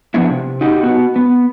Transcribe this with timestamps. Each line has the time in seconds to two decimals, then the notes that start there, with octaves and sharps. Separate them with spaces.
0.14 F3 B3 D4 E4
0.29 C3
0.61 D#4 F#4 G4
0.83 B3 F#4
1.16 B3